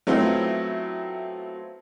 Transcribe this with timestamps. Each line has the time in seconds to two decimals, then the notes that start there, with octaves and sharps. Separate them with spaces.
0.07 F#3 A3 B3 C4 E4 F4